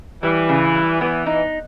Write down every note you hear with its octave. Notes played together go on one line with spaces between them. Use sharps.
E3 G3
C#3
G3
E3 B3
D#4